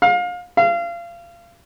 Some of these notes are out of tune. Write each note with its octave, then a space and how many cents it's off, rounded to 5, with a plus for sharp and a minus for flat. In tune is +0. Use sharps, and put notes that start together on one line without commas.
F5 +30
F5 -30